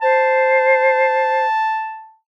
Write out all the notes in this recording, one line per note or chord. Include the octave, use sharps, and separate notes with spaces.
C5 A5